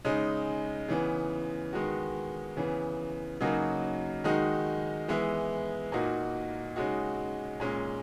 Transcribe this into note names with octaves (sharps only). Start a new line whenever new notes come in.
C#3 G#3 D#4
C#3 E3 B3
D#3 G#3 B3 F#4
C#3 E3 B3
C#3 F#3 A#3 D#4 F#4
D#3 G#3 D#4 F#4
E3 G#3 B3 E4
A#2 A#3 D#4 F#4
C#3 G#3 D#4 F#4
A#2 G#3 C#4